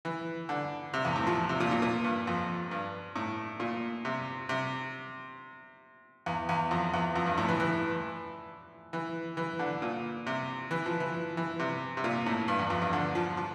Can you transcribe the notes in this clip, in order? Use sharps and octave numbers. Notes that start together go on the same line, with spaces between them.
E3
D3
C3
E2
A2
F3
C3
A#2
A#2
A#2
G2
F2
G2
A2
A#2
C3
C3
E2
E2
F2
E2
F2
G2
A2
E3
E3
E3
E3
D3
A#2
C3
E3
F3
E3
E3
C3
C3
A#2
A2
G2
E2
F2
G2
D3
F3
F3